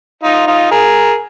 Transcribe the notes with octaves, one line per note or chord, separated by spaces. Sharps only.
D#4 F4
D#4 F4
G#4 A#4